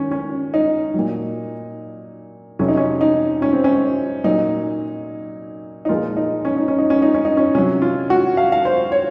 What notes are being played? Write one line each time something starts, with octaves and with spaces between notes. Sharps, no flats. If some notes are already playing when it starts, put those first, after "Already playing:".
Already playing: D#3 C#4
C#4
D#4
A#2 F#3
F2 C3 F#3 C#4
D#4
C#4
D#4
C#4
C4
C#4
A#2 F#3 D#4
D#4
A#2 F3 G#3 F4
D#4
C#4
D#4
C#4
D#4
C#4
D#4
C#4
D#4
C#4
C3 F#3 C#4
F4
F#4
F5
F5
C5
C#5